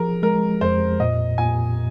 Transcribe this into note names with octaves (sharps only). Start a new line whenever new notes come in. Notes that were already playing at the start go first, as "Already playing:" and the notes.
Already playing: F3 G#4 A#4
G#3 A#4
F2 C5
A#2 D#5
A#2 G#5